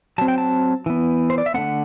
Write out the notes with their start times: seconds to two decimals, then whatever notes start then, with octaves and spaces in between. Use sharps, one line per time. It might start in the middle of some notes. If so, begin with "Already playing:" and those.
0.18 F#3 C4 A5
0.28 G5
0.38 A5
0.86 E3 B3
1.30 C5
1.38 D5
1.46 E5
1.54 D3 A3 C4 F#5